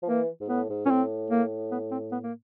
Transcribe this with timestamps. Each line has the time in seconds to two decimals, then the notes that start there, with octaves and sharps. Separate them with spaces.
0.03 F3
0.08 E3 A#3
0.41 G#2
0.49 A2 B3
0.70 G#2
0.86 A#2 C#4
0.90 A2 C4
1.30 A#3
1.71 B3
1.91 C4
2.12 B3
2.23 A#3